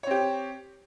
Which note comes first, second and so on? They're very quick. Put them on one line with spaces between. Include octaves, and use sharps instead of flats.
C#5 C4 G4